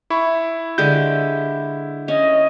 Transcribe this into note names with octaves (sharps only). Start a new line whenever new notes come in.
E4 B5 C#6
D3 G#3 G4 G6
C#4 D#5